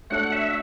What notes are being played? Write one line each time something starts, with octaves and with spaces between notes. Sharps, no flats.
A3 D4 F#4 A4 C#5 F#5
E5